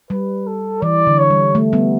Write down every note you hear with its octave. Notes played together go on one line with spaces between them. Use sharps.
G3 B4
A4
E3 D5
D3
C#5
G3
A3
G3 B3